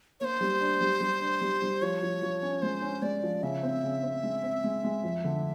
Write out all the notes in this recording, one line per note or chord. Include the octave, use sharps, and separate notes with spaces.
A#3 C5 C#5
G3
D4
G3
G3
D4
G3
G3
F3 C#5
F3
F3
C#4
G#3 C5
C#4
G#3 D5
F3
C#3 E5
C4
C#3
C4
G#3
C4
G#3
G#3
F2
D3